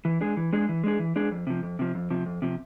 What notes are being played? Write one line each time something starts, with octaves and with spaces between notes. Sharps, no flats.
E3
G#3 D4 G#4
E3
G#3 D4 G#4
E3
G#3 D4 G#4
E3
G#3 D4 G#4
F2
C3 F3
F2
C3 F3
F2
C3 F3
F2
C3 F3